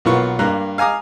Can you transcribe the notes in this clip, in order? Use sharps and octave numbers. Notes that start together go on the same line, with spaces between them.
B1 A#3 B3 F4 C#6
G2 A#3 A#5 F#6
F5 G#5 A#5 D6 D#6